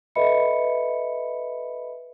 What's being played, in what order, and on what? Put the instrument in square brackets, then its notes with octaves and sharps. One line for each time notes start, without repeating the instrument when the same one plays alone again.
[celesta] A4 B4 D#5 E5 B5 C#7